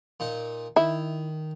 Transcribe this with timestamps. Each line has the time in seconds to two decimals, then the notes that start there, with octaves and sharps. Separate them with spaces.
0.20 A#2 D#4
0.76 D#3 E4